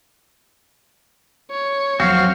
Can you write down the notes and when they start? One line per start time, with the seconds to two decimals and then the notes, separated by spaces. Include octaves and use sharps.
1.51 C#5
2.00 D#2 F3 F#3 C4 F#4 F5